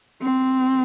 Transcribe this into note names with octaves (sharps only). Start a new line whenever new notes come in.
C4